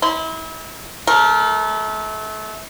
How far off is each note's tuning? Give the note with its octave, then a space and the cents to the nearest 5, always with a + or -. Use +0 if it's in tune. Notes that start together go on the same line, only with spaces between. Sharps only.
E4 -35 C6 -20
A3 -30 A#4 +0